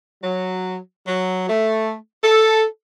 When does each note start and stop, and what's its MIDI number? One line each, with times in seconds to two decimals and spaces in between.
0.24 0.77 54
1.06 1.48 54
1.49 1.94 57
2.23 2.65 69